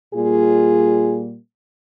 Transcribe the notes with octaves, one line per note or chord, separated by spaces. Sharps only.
A#2 G3 A#3 F4 G#4